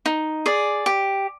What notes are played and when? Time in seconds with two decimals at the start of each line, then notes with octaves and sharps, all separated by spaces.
0.06 D#4
0.46 G#4 D5
0.86 G4